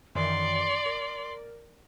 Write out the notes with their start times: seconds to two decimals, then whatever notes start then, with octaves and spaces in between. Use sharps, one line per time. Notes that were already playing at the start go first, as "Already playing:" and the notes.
0.15 F#2 D#3 E3 D5 C6
0.86 A#4